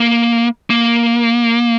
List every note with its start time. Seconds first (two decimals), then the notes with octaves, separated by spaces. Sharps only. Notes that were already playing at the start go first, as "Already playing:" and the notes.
Already playing: A#3
0.70 A#3